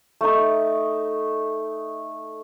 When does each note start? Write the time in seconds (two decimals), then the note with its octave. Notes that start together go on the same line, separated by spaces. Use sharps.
0.21 A3 D#4